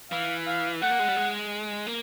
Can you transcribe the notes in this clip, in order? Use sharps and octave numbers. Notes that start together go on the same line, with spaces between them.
E3 F5
F5
A3 F#5
A#3
G#3
G3
G#3
A#3